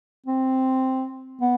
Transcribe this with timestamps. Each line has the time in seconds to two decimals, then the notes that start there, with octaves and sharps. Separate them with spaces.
0.27 C4
1.41 B3